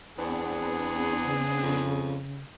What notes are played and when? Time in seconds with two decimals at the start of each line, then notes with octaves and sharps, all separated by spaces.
0.18 E2 B3 C4 D4 G#4
1.24 C#3
1.62 F2